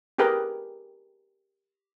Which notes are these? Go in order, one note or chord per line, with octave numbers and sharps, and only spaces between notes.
G4 G#4 A#4 B4 G5